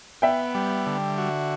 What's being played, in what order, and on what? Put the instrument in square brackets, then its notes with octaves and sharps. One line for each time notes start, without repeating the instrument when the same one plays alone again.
[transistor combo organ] B3 [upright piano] E5 G5
[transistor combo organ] G3
D3
F#4